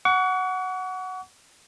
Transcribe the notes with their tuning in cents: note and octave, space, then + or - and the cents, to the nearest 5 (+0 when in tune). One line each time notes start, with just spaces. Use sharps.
F#5 +0 C#6 +40